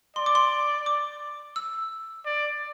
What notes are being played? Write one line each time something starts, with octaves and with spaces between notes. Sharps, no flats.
D5 C6
D6
C6
D6
E6
D5